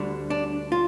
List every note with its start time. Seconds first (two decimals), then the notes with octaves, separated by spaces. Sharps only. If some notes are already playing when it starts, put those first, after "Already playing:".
Already playing: D2 D3 G3 D4
0.30 D4
0.72 F4